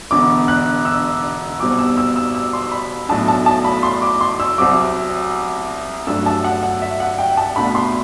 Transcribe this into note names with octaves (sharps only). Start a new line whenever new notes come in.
E1 E2 D3 D6
F#6
E6
B1 B2 G3 C4 D6
E6
E6
E6
E6
C6
B5
B1 A2 F#3 A3 D4 A5
A5
A5
B5
C6
D6
C6
E6
C2 C3 F#3 D6
G2 F#3 A3 D4 E6
A5
F#5
F#5
E5
F#5
G5
A5
C2 B2 A3 D4 B5
C6